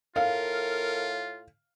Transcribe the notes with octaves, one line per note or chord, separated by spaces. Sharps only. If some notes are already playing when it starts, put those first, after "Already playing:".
A2 F4 A#4 F5